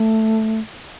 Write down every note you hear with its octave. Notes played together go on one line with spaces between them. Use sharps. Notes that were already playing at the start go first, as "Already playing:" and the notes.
Already playing: A3